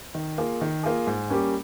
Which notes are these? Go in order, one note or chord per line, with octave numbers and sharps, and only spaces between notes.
D#3
A#3 F4 G#4
D#3
A#3 F4 G#4
G#2
G3 A#3 C#4 G4